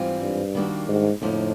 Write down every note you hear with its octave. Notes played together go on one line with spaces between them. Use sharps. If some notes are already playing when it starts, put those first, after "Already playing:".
Already playing: G#2 E3 G3 C4 F4
G2
D#3 G3 A#3 D4 F#4
G#2
F2 A2 D3 F3 A#3 D#4